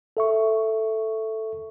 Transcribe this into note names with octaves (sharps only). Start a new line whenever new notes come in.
A4 E5 C#6